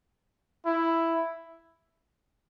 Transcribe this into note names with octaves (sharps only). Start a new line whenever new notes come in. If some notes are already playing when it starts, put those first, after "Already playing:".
E4